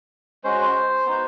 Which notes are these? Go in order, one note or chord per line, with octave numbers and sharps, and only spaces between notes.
G#3 C#4 F#4 C5
B3 D#4 F#4